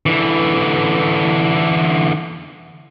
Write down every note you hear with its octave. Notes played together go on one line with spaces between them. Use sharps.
D3 E3